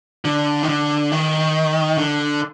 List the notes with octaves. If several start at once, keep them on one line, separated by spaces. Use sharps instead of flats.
D3
D#3
D3
D#3
D3